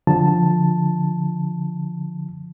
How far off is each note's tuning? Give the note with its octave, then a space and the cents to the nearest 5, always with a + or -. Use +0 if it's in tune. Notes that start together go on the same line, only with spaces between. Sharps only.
D3 +0 F3 +0 A5 +0